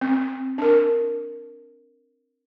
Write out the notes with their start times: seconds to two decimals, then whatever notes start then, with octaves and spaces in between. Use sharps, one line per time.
0.01 C4
0.58 D4 A#4